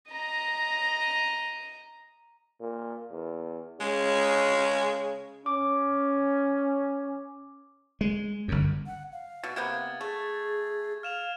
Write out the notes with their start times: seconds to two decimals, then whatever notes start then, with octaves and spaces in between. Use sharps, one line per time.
0.11 D#5 A#5
2.61 A#2
3.11 E2
3.80 C#3 G#3
5.46 C#4 D6
8.01 G#3
8.48 G1 F#2
8.87 F#5
9.12 F5
9.44 B2 A6
9.56 C3 A#3 B3 G#6
10.01 A3 G#4
11.03 F5 F6 E7 F7